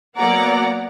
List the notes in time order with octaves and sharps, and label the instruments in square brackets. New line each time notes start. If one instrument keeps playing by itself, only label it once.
[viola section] F#3 A#3 B3 D5 F#5 A#5